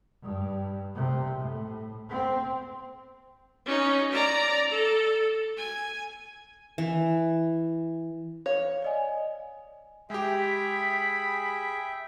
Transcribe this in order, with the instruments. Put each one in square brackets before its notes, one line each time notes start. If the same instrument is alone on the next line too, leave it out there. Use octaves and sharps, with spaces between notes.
[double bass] G2
C3
A2
C4
[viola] C#4 D#4
D5 A#5
A4
G#5
[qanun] E3
[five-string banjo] C#5 [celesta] F5
[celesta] D5 D#5 G#5
[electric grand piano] G#3 G4 [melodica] G#4 [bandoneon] E5 G5 [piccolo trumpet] B5